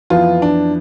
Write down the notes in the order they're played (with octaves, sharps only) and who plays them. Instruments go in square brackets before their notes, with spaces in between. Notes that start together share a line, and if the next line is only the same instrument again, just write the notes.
[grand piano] F2 E3 B3 F4
D4